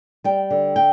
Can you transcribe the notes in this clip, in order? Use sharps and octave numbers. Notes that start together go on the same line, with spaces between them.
G3 G5
D3
G5